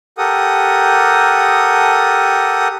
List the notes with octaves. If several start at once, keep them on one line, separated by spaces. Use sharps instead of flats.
G4 A4 A#4 F#5 D#6